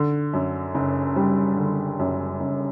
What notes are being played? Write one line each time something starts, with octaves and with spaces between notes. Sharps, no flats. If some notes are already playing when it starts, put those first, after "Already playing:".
Already playing: D3
F#2
F#1
G3
D3
F#2
F#1